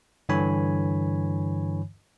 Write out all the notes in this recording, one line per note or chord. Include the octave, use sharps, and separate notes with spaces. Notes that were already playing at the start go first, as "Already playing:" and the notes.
G2 D3 E3 C#5 G#5 B5